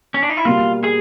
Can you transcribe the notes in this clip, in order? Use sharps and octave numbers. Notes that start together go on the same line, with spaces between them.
C#4
D4
D#4
E4
B2 G3 A#3 F4
G#4